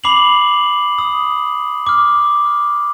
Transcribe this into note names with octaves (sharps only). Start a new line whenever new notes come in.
B5 D6 C7 F7 F#7
D#6
D6 F6